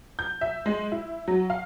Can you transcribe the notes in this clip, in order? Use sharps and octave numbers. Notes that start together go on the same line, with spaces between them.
G6
E5
G#3
E4
F#3
F5